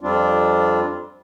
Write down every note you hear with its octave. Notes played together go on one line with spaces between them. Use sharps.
F2 G3 C4 D4 F4